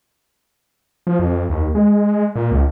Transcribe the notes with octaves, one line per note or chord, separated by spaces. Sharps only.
F3
F2
D#2
G#3
A#2
C#2